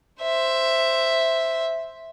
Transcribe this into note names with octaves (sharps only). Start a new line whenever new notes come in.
C5 E5